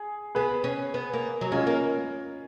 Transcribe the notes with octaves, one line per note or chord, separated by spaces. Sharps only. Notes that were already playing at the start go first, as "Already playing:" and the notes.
Already playing: G#4
B3 G#4 B4
C#4
B3
A#3
F#3
G#3 C#4 F4
A#3